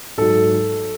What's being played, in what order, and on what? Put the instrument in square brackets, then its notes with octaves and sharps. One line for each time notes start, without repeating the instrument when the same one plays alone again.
[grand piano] G#2 F#3 A4